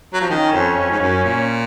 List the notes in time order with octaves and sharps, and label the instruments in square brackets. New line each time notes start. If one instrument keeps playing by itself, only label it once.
[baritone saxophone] F#3
F3
[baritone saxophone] D#3 [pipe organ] C#4
[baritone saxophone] F2
F2
G#2
F#2
A#2